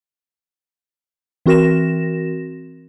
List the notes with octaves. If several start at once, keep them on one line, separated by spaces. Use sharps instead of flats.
E3 C4 F#4 A#4 A#6 E7